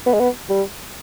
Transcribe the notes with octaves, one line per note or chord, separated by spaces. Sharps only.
B3
G#3
B3
G3